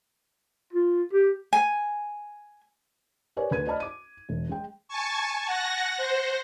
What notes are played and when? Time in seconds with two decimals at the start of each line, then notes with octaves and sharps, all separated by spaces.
0.73 F4
1.13 G4
1.53 G#5
3.36 G4 A#4 B4 C#5 D5 G#5
3.51 D2 B4 G#6 D#7
3.66 C5 D5 D#5 A5 B5 F6
3.80 D6 D#7
4.29 E1
4.49 G#3 G5
4.88 G#5 A5 C#6
5.45 F#5 A#6
5.97 C5